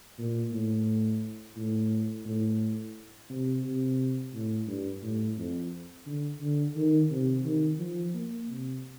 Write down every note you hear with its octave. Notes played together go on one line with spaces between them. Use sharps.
A#2
A2
A2
A2
C3
C3
A2
G2
A2
F2
D3
D3
D#3
C3
D#3
F3
A#3
C3